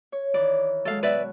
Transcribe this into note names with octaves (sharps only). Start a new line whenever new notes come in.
C#5
D#3 E3 D5
F#3 G#3 A4 F5
B2 F#4 B4 D5 E5